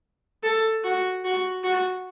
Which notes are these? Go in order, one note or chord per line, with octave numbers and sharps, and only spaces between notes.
A4
F#4
F#4
F#4